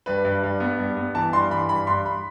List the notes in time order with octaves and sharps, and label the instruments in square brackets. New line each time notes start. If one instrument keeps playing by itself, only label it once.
[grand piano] G2 B4
G2
G2
B3
G2
B3
E3 A5
G2 C6
E3 B5
G2 B5
G2 C6
B5